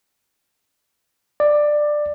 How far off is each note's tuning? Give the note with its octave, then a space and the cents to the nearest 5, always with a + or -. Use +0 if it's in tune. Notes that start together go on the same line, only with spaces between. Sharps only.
D5 +15